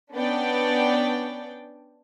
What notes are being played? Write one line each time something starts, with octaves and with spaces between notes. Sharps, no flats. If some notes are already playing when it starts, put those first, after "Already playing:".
B3 C#4 D4 D5 G5